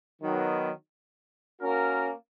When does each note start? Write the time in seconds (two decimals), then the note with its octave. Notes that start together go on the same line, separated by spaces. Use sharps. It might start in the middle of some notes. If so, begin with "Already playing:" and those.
0.21 D#3 F#3 B3
1.60 A#3 C#4 F#4 A#4